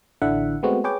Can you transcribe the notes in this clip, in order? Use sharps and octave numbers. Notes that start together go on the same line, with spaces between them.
A1 D3 D4 E4 E5 F#5
G#3 A3 B3 C4 F#4
G#4 B4 C#5 G5 D6